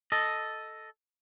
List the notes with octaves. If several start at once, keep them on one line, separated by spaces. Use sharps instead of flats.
A4 D#5